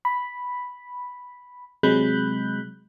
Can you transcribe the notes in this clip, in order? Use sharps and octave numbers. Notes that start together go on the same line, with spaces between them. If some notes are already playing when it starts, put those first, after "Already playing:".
B5
C3 F#3 G#3 B5 F#6 G6